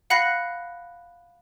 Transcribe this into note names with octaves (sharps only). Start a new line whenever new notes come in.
F5 F#5 B5 F#6 A#6 C7